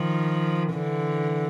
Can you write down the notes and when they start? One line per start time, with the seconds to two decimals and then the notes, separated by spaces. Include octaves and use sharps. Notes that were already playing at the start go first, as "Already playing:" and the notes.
Already playing: D#3 F3
0.73 D3 E3